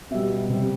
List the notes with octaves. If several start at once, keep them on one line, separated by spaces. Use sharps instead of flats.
B2 G3 E5
C3 G3